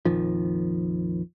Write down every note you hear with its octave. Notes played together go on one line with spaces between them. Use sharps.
A#1 F2 D#3 F3